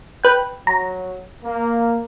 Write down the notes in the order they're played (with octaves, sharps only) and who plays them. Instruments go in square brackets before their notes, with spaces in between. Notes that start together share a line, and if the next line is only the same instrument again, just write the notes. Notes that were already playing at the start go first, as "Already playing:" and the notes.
[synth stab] B4 G5
[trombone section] F#3 [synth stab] A#5
[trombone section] A#3